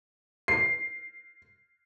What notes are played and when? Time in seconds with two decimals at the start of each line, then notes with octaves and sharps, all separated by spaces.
0.48 C7